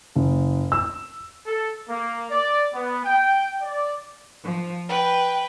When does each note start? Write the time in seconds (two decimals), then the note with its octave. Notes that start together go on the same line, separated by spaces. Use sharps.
0.16 F#1
0.72 E6
1.47 A4
1.89 A#3
2.31 D5
2.73 B3
3.04 G5
3.62 D5
4.44 F3
4.89 B4 G5